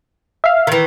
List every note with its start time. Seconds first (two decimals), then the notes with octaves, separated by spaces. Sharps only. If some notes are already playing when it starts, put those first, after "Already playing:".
0.44 E5 F5
0.67 D#3 E3